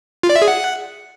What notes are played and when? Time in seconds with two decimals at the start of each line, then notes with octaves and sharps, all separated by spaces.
0.23 F4
0.30 D5
0.36 E5
0.42 G#4
0.48 F#5